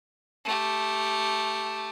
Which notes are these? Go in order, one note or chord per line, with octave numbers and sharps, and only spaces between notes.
A3 G4